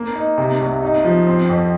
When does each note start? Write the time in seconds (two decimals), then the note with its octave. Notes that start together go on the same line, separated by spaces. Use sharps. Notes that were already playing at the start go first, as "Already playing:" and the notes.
Already playing: A#3
0.16 D#4
0.38 C3
0.61 C2
0.82 D#4
1.04 F3
1.26 C4
1.49 F2